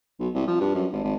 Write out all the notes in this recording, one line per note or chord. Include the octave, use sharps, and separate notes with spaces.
B1
C2
F3
G2
F#2
G#1
G#1